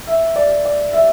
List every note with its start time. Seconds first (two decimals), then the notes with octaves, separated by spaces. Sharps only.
0.07 E5
0.36 D5
0.65 D5
0.93 E5